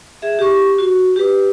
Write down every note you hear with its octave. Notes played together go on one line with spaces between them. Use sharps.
G#4 E5
G4 C#6
F#4
G4 B4